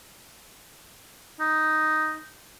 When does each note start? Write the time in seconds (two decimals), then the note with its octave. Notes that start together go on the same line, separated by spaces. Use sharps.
1.41 D#4